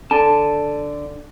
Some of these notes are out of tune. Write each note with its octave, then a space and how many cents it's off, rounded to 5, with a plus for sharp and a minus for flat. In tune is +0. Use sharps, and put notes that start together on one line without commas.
D3 +0 A5 +0